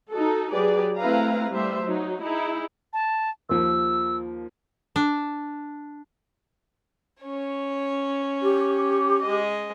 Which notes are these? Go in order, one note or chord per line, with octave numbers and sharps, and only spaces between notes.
D#4 F#4 A4
F#3 G4 G#4 B4 D5
A3 C4 E4 B4 F5 A#5
G3 A3 C5 E5
F#3 D#4
D#4 E4 G#4
A5
D#2 F3 A#3 E6
D4
C#4 C#5
G4
G#3 D#5